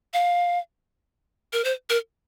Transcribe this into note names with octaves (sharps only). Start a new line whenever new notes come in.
F5
A#4
C5
A#4